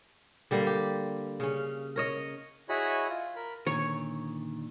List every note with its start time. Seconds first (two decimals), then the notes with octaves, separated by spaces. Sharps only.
0.51 D3 G3 A#3
0.67 G4
1.40 C#3 C#4
1.96 A#4 C#5 D#5
2.69 E4 F#4 G#4 C#5 D#5 B5
3.09 F4
3.36 A#4 B5
3.67 A#2 D3 D#3 C#5